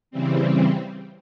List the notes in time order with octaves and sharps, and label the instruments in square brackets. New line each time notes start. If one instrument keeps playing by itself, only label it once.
[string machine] C#3 E3 G3 C4